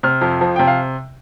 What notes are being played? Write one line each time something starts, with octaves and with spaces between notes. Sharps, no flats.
C3 F6
F2
F3
C3 G5
F5